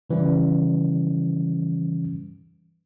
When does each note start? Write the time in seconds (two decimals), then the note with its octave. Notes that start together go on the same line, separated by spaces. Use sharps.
0.10 C#3 E3 G3 C#4